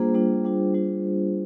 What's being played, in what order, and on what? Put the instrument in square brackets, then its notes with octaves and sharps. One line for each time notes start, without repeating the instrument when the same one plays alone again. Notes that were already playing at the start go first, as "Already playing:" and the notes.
Already playing: [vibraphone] G3 A#3 D4 F4 G#4 C5
G3 A#3 D4 F4
G3 D4 F4
G3 D4 F4